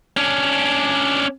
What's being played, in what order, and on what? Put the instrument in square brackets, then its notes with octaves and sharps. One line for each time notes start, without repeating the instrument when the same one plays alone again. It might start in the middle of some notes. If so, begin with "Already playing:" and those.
[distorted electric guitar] C#4 D4